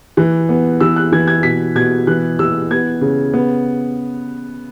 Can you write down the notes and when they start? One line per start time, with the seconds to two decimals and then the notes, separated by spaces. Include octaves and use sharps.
0.17 E3
0.49 B3
0.80 E3 E6
0.96 F#6
1.12 E3 G#6
1.28 G#6
1.43 B2 B6
1.75 B2 G#6
2.07 E3 F#6
2.39 E3 E6
2.71 B3 G#6
3.01 C#3
3.34 B3